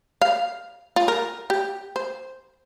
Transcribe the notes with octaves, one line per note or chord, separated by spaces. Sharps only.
F5
F4
A#4
G4
C5